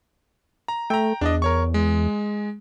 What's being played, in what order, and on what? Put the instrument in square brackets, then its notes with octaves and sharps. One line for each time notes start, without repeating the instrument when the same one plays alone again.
[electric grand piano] A#5
[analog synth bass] A3 [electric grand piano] G5 A#5
[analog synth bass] E2 [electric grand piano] D4 D5 D#5
[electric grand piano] A#4 C#5 C#6
G#3